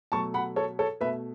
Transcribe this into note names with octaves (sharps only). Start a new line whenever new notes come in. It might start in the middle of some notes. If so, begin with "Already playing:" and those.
B2 F#3 A3 A5 C#6
F#5 B5
A4 C#5
A4 C#5
B2 A3 B4 E5